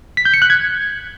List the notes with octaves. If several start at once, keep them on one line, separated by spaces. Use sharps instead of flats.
B6
G6
C#7
F#6
G#6